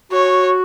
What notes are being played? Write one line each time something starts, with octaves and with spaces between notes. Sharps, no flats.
F#4 C#5